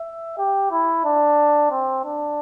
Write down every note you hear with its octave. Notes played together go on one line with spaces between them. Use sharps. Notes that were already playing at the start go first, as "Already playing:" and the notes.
Already playing: E5
G4
E4
D4
C4
D4